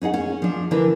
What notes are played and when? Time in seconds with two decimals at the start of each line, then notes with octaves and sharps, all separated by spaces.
0.02 C#4 D#4 G#4 F#5
0.14 C#4
0.42 F3 D4
0.71 D3 E3 D4 E4 A#4 B4